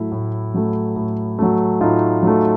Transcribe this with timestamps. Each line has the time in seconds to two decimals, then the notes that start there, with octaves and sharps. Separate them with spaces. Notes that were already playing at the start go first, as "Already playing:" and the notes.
Already playing: A2 F#3 A3 E4
0.12 A2
0.54 F#3 A3
0.96 A2
1.39 F#3 A3
1.80 A2 D#4 F4
2.23 F#3 A3